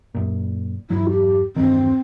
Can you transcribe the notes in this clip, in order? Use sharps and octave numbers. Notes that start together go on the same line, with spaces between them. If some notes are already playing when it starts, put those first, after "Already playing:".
F#2 A#2
E2 G2 F#3 E4
G4
E2 G2 D#3 C4